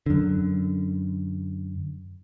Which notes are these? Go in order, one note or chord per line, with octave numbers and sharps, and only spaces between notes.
F#2 D3